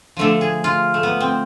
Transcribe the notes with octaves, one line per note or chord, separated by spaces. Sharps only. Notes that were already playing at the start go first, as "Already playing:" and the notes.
D3 F3 A3 A4
G#4
F4
A3
B3
C4